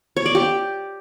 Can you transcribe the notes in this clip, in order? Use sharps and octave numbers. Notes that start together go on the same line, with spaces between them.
C#5
D5
G4